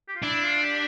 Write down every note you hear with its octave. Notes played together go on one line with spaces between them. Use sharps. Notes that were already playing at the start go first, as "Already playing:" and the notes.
G4
F4
D4 E4
F4
G4